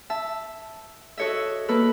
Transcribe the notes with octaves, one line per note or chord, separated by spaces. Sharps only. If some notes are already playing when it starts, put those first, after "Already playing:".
E5 A5
F#4 A4 C#5 D#5 E5
A#3 A4 B4